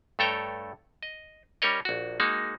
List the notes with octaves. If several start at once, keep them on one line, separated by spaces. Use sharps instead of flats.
G2 A3 A4 C#5 G5 A#5
D#5
G3 C#4 A#4 C#5 D#5
A#1 F#4
G#3 A#3 D#4 F#4